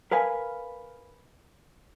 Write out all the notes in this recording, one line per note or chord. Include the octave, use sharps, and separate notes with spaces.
A#4 B4 F5 G#5